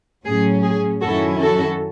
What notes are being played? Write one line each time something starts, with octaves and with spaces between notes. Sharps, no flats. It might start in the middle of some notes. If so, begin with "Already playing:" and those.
A2 F#3 C#4 G#4
G#4
F#2 D#3 F#3 C#4 E4 F#4 A4
F#4 A4